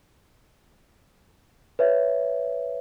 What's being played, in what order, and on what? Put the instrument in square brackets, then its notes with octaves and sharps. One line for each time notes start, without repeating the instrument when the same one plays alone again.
[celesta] B4 C#5 E5